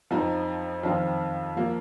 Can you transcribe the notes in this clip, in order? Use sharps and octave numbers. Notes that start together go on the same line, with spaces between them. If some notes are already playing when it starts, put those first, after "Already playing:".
F2 F3 C4 D#4
F2 D#3 C4 F4
F3 A#3